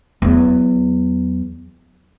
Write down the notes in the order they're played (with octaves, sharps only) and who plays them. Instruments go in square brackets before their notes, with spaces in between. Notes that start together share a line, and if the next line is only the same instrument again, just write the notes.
[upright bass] E2 F#3